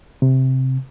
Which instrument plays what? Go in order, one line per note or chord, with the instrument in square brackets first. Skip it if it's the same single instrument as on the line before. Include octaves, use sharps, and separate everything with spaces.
[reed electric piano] C3